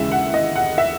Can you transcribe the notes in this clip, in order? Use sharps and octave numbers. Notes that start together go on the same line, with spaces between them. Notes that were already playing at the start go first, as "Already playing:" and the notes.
Already playing: D#2 C#3 E3 G#3 E5
F#5
D#5
F#5
E5